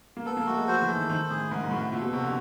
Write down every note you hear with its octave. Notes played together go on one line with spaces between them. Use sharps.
A#3
B3 A4
A#3
A3 F#4
G#3
F#3 C5
E3
A4
D#3
D#3 C5
A2 G#4
G#2 A#4
G#2
A2 F#4
A#2 A4
B2
C3 F#4
D3